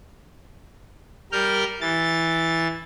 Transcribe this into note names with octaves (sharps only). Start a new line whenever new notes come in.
G3 A#4 F6 G6
E3 A6